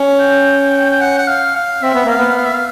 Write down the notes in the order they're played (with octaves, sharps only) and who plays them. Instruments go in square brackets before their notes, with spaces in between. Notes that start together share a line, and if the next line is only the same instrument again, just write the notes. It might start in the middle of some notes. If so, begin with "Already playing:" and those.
Already playing: [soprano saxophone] C#4
[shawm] G5
G5
F#5
F#5
F5
F5
[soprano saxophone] C4 [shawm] E5
[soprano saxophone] B3
[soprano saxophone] A#3 [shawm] F5
[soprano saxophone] B3
[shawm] F5
E5
F5